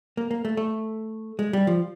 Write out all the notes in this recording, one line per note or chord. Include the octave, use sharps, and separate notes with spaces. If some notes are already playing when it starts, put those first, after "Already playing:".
A#3
A#3
A3
A3
G#3
G3
F3